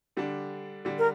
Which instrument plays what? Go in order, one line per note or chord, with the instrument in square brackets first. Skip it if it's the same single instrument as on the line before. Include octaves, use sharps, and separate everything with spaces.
[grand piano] D3 G3 D4
D3 G3 D4
[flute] A#4